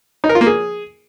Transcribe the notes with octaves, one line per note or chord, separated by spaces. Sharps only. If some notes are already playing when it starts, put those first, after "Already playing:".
D#4
A#4
F4
A#3
G#4